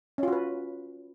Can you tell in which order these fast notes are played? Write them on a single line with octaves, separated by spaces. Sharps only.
C#4 F4 F#4 B4